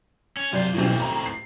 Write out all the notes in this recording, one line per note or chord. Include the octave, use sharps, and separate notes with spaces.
C#4
F#2 C3 F4 D5 G6
B1 A2 E3 C4
A#5
C7